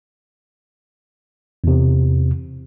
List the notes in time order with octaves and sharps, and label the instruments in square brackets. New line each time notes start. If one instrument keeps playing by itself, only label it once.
[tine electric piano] E2 C3